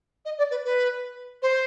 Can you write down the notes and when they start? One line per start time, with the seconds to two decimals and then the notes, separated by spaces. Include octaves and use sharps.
0.25 D#5
0.38 D5
0.50 B4
0.64 B4
1.42 C5